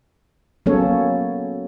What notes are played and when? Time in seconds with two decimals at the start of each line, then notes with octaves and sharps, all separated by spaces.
0.66 F#3 A#3 B3 C#4 A4 C#5